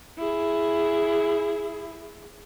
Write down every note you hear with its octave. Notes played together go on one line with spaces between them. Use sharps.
E4 G#4